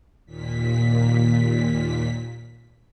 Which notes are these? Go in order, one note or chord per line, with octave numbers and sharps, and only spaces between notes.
D#2 A#2 B6